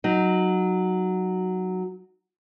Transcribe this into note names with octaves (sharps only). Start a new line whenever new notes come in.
F#3 D#4